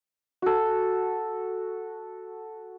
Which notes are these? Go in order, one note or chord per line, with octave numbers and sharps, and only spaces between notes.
F#4 A4